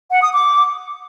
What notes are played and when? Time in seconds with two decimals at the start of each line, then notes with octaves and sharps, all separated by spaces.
0.12 F#5
0.22 D#6
0.33 D6